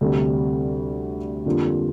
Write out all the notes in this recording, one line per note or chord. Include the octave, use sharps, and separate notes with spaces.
D2 C3 G3 D4
F2 D3 G3 A#3 F4